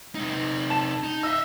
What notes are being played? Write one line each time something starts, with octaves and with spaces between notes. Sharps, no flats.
C3 D#4
A5 E7
D#4
D#5 E5 E6